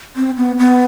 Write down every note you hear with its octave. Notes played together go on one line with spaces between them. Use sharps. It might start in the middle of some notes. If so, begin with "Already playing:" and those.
C4
B3
B3